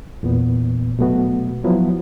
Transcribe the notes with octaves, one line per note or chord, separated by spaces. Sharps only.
E2 A#2 B3
B2 F#3 A3 B3 F#4
F3 F#3 B3 E4